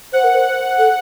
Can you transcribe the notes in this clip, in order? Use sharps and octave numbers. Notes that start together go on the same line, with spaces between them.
C5 F#5
A#4
C5
A4